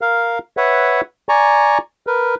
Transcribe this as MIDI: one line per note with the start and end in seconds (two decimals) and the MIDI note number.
0.01 0.39 70
0.01 0.39 77
0.57 1.01 71
0.57 1.01 73
0.57 1.01 76
0.57 1.01 78
1.29 1.78 74
1.29 1.78 80
1.29 1.78 82
1.29 1.78 85
2.07 2.35 70
2.07 2.35 71